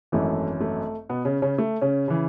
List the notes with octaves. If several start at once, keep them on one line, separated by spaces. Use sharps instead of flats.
G#1 F#2 E3 A3
A3
B2 B3
C#3 C#4
C#3 C#4
A3
C#3 C#4
C#3 E3